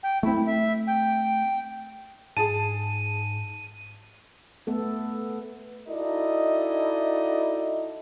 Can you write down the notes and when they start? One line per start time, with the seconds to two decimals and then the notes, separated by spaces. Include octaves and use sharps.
0.03 G5
0.23 A3 C4 E4
0.46 E5
0.87 G5
2.37 G#2 G#4 A5 D#7
4.67 A3 B3 A4
5.88 D#4 E4 F#4 A4 D5 D#5